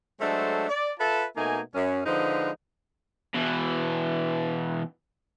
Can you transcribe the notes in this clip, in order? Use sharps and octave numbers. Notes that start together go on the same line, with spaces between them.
F#3 G#3 A3 D4 A4 C5
D5
F4 A4 B4 E5 A5
B2 A3 A#3 D#4 G#5
F#2 C#4
D3 F3 G#3 D#4 B4
B2 E3